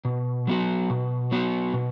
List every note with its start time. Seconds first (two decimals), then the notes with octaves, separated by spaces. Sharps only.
0.05 B2
0.47 F#3 B3 F#4
0.90 B2
1.32 F#3 B3 F#4
1.74 B2